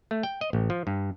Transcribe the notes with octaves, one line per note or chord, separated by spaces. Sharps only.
A3
G5
D#5
A1
F3
G2